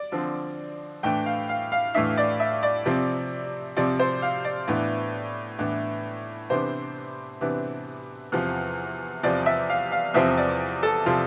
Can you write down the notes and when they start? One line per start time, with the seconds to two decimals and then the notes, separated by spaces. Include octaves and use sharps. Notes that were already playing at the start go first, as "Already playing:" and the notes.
Already playing: D5
0.12 D3 F3 C4
1.03 A2 E3 A3 D4 G5
1.26 F5
1.49 F5
1.72 F5
1.94 A2 E3 A3 D4 E5
2.18 D5
2.40 E5
2.63 D5
2.86 C3 F3 C4
3.77 C3 F3 C4 D5
4.00 C5
4.22 F5
4.45 D5
4.68 A2 E3 B3 D4
5.59 A2 E3 B3 D4
6.50 C3 E3 B3 D4 C5
7.41 C3 E3 B3 D4
8.32 E2 C3 F3
9.23 E2 C3 F3 D5
9.46 E5
9.70 F5
9.92 F5
10.14 E2 C3 F3 C4 E5
10.38 D5
10.83 A4
11.06 C3 F3 C4 F4